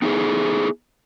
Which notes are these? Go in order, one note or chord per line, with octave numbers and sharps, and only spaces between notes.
B3 D#4 E4 F#4 G#4 A4